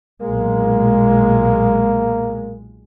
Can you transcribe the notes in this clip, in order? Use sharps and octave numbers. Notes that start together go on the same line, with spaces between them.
B1 A#2 G#3 A#3